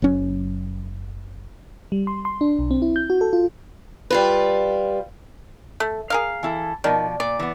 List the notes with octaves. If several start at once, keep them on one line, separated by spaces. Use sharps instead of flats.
F#1 F#3 C#4
G3
C6
C6
D4
B1
C4
E4
G6
F#4
A4
F4
G3 F4 B4
A3
G#4 A#4 F5
E3 E4 A4
B2 D#3 F3 D5
A#2 D5
E3 B3